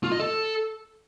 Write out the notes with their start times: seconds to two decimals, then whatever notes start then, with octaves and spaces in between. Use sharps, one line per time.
0.04 F4
0.12 D#5
0.20 A4